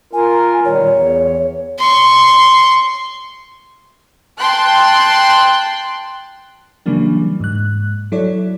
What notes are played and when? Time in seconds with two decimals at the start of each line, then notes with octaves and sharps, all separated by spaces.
0.13 F4 A#4 G#5
0.65 A#2 D#3 G3 C#5
0.85 E2
1.79 C6 C#6
4.39 G5 A5 C6 F#6
6.86 C#3 E3 F#3 G3 A#3 D4
7.40 G#2 F#6
8.12 F#3 E4 A4 C#5 D5